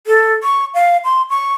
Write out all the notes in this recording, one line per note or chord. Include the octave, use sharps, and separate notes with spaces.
A4
C#6
F5
C6
C#6